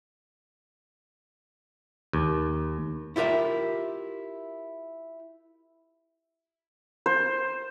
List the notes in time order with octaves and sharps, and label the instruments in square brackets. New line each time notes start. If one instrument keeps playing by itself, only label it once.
[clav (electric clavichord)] D#2
[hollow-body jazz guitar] E4 F4 G4 A#4 E5
[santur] C5